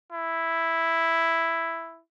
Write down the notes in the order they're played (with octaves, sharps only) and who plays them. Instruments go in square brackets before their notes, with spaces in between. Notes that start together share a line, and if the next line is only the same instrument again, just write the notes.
[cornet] E4